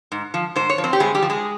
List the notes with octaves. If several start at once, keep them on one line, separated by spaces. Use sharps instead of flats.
G#2
F3
G#2 C5
C#5
F3
C4 C5
G4
G2 G#3 G#4
G3 G4
F3
G#3 G#4